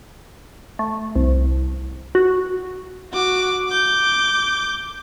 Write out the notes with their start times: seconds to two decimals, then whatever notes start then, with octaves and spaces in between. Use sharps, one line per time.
0.79 A3
1.16 C2
2.15 F#4
3.13 F#4 D6
3.69 D6 G6